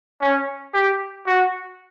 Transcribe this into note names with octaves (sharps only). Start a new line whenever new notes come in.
C#4
G4
F#4